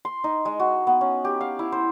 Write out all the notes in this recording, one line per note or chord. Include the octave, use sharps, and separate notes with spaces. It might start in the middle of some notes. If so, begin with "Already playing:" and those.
C6
D#4
G#3
F#4
B3
C#4
G4
F5
E4
C5